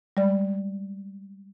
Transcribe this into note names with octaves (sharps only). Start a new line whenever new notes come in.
G3 G#3 D5